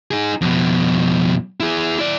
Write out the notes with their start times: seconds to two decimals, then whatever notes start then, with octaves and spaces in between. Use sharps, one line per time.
0.11 D#4 G#4
0.41 F2 B2
1.60 E4 G#4
1.99 E4 D5